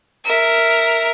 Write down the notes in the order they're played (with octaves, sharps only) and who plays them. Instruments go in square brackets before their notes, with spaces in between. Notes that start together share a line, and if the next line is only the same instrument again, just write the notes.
[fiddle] A#4 E5